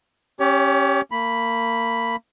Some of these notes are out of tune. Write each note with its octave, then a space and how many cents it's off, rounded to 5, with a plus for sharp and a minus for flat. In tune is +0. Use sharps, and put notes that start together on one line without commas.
C#4 -15 G4 +0 C#5 +30
A#3 -30 B5 +0